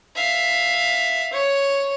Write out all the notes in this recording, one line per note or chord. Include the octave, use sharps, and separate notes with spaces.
E5 F5
C#5